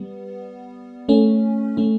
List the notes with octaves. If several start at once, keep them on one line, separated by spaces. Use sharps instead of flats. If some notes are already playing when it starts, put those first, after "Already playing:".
Already playing: G3 B3
A3 C#4
A3 C#4